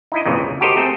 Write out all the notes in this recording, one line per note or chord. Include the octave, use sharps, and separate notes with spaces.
D#4 E4 D#5
F2 A#2 C#3 E3 F3
C#2
F#4 G4 A4 A#4 C5 D#5
A3 C4 G#4 A4 C5